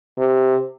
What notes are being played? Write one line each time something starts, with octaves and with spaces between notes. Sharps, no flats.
C3